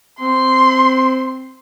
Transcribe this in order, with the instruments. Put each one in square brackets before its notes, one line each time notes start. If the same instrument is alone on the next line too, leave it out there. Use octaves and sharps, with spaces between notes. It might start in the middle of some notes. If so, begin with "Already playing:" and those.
[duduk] C4 [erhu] C6